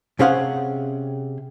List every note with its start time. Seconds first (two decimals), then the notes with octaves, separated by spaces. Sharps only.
0.19 C3 C#4 G#4 C5 F5 F#5